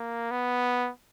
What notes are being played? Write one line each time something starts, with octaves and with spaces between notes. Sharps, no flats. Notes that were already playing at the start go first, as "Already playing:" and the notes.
Already playing: A#3
B3